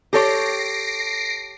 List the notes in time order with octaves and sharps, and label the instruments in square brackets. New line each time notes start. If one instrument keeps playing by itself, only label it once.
[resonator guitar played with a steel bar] G4 A4 C#5 [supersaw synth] A#6 C7 D7